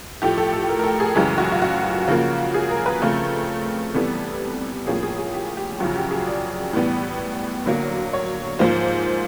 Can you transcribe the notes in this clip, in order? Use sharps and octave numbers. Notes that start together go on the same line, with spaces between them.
A2 F3 A3 G4
A4
A4
A#4
A#4
A4
G#4
F#2 C#3 E3 G#3 G4
F#4
F4
F#4
C#3 F3 A#3
G#4
A#4
B4
C#3 F3 A3 C4 A#4
C3 E3 G3 B3 A4
A2 F3 A#3 C#4 G#4
G#4
G#4
G4
G4
F#2 C#3 F3 F#4
G4
G#4
D5
A2 E3 G3 B3
D3 F#3 A#3
C#5
G#2 F3 A#3 C5